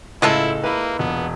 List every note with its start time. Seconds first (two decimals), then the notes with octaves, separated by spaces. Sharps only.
0.22 C#2 A2 G#3 E4 F4 A4
0.64 A#3 E4 B4 B5
0.99 E1 A#2 B3